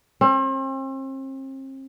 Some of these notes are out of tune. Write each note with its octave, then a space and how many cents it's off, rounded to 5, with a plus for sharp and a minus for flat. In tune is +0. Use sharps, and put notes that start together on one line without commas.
C4 +40